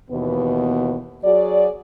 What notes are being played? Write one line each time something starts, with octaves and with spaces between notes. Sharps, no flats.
D#2 B2 E3 B3
F#3 F#4 G#4 D5